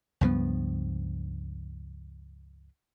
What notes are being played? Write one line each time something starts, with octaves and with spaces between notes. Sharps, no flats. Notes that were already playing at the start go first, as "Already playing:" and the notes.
C#2 G2 F3 B3